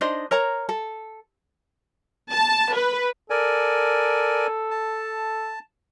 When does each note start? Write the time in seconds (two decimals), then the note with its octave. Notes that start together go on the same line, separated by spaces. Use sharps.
0.01 D4 D#4 C5 D#5
0.31 A#4 C#5 A#5
0.69 A4
2.31 A5
2.74 B4
3.30 A4 A#4 D5 G#5
4.71 A5